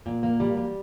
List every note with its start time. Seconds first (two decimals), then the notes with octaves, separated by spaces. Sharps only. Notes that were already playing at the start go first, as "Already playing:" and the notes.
0.06 A#2
0.23 A#3
0.40 G3
0.57 G3